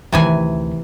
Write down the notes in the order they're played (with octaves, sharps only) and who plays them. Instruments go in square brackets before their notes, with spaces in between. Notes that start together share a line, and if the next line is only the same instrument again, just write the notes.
[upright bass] D2 D#3 [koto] C3 E3 G#5